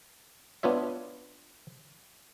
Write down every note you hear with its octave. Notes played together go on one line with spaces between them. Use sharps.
B3 D4 F4 C#5 E5